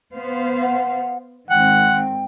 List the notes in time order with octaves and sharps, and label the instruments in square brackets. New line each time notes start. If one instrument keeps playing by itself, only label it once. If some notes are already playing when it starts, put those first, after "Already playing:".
[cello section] B3 C5 F5
[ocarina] F#5
[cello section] G#2 D#3 C4 [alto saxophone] F#5 [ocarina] G5